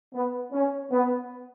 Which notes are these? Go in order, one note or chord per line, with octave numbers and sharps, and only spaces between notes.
B3
C#4
B3